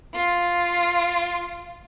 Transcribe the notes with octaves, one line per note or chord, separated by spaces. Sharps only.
F4